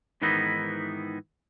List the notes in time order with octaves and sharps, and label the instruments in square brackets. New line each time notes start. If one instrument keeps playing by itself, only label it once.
[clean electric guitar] G#2 D#3 E3 B3 D#4 E4